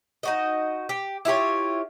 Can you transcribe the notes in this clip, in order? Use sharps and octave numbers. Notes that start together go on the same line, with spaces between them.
D#4 F#4 D#5
G4
E4 F4 G4 C#5